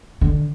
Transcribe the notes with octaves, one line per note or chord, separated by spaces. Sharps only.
D3